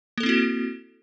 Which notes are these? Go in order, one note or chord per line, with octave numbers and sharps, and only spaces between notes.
A#3 C4 E4 F#4 A4